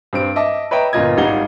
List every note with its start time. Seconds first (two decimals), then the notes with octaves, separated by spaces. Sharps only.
0.13 G2 C4 D7
0.36 D#5 E5 A5 D6
0.71 B4 C#5 D#5 E5 G5 A#5
0.93 G1 A#2 A#3 F4 D#5 G#6
1.17 G#1 G3 D#4 F5 F#5 G7